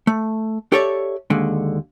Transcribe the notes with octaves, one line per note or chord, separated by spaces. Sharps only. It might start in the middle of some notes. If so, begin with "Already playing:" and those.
A3
G4 A4 C#5 D5 E5
D#2 D3 G#3